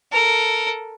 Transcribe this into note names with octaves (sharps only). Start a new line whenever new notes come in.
A4 A#4